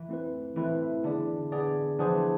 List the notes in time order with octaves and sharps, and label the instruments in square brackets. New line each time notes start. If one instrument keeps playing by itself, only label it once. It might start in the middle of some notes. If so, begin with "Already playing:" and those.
Already playing: [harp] E3
[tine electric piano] A3 C4 E4 B4
[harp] E3 [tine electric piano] A3 C4 E4 B4
[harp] D3 [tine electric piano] B3 D4 G#4 D5
[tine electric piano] B3 D4 G#4 D5
[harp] E3 [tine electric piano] F3 B3 D4 G#4 C5
[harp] A3